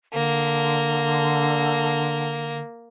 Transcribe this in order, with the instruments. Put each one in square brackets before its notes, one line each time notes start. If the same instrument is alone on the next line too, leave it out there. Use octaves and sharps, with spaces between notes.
[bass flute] D3 [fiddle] A#3